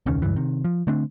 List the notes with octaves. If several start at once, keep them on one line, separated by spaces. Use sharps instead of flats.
E1 C#2 D#3 C#4
F#1 C#2 G2 E3
C3 D#3
F3
D3 A3 C4 D4